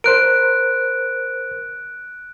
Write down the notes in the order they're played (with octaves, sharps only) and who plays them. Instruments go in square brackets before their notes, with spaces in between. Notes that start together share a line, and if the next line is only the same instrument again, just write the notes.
[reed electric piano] A#4 C5 [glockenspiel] F#6 D7